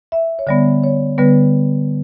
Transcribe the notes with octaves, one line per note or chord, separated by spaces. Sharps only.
E5
C#5
D3 G3 B3 D5
C#5
D3 G3 B3 B4